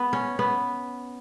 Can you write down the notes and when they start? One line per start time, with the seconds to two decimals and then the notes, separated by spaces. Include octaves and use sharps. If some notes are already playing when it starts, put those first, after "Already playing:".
Already playing: B3
0.13 C#4
0.39 B3